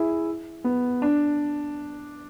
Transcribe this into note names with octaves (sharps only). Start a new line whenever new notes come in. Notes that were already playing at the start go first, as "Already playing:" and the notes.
Already playing: E4 G#4
B3
D4